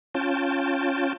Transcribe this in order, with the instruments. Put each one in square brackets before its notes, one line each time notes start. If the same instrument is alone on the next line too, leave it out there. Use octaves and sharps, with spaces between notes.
[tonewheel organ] C#4 F4 G5 A5